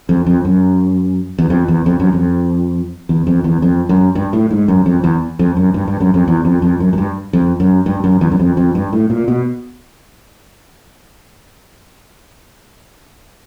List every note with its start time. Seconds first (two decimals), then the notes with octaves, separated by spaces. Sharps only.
0.09 F2
0.26 F2
0.45 F#2
1.39 E2
1.50 F2
1.68 E2
1.86 F2
2.00 F#2
2.13 F2
3.09 E2
3.27 F2
3.44 E2
3.62 F2
3.89 F#2
4.15 G2
4.33 A2
4.51 G#2
4.68 F#2
4.86 F2
5.04 E2
5.39 F2
5.57 F#2
5.74 G2
5.88 G2
6.00 F#2
6.14 F2
6.28 E2
6.45 F2
6.62 F2
6.80 F#2
6.93 F#2
6.98 G2
7.33 F2
7.60 F#2
7.86 G2
8.04 F#2
8.21 E2
8.31 F#2
8.39 F2
8.57 F2
8.75 G2
8.93 A2
9.10 A#2
9.28 B2